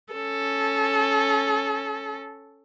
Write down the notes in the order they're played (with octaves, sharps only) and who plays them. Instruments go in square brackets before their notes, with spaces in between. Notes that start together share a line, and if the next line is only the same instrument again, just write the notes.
[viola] C#4 A4